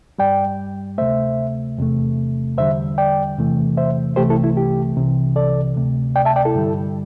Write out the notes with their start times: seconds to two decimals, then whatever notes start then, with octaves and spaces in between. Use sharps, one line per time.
0.19 G2 G3 D5 G5
0.98 D2 C3 A3 C5 E5
1.78 E2 C3 A3
2.58 E2 D3 G3 C5 E5
2.98 D5 G5
3.37 E2 C3 E3 A3
3.77 C5 E5
4.16 C2 C3 E3 A3 G4 C5
4.30 E4 A4
4.44 E4
4.57 G4
4.96 C2 C3 E3
5.36 A4 D5
5.75 D2 C3 A3
6.16 D5 G5
6.25 E5 A5
6.36 D5 G5
6.45 E4 A4
6.55 G2 D3 G3